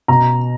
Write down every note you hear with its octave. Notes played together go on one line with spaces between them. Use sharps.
B2 A#5